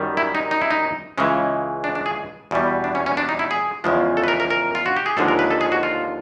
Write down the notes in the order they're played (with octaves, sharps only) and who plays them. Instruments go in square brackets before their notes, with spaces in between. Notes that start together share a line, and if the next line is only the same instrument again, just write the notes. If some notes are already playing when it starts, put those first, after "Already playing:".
Already playing: [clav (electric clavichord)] F#2 D#3 G3
E4
D#4
D#4
E4
D#4
C#2 C#3 E3 G#3 C#4
D4
D4
G#4
E2 B2 G3
D4
C#4
C#4
D4
D#4
E4
G#4
E2 C#3 F3 G#3
A4
B4
A#4
A#4
A#4
F4
F#4
G4
G#4
D#2 D3 F3 G#3 A4
A#4
B4
A4
G#4
F#4
F4